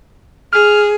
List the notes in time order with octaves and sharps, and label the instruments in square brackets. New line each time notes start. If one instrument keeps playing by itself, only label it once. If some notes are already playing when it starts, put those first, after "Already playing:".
[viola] G#4 [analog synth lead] F6